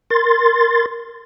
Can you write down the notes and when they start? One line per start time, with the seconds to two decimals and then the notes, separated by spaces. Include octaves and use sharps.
0.10 A#4 C6 A6